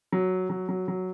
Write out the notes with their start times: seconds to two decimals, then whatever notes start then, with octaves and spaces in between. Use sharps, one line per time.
0.12 F#3
0.50 F#3
0.69 F#3
0.88 F#3